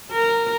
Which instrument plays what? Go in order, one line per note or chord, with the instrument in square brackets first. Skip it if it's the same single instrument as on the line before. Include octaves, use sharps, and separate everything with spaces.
[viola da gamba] A#4